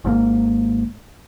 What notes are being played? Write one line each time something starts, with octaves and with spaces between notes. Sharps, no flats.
G#1 G#2 D#3 A#3